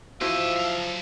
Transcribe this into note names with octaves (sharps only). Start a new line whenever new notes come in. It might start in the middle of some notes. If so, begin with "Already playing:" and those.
F3 E4 F#4 G4 C5 D#5 E5
F#3 F5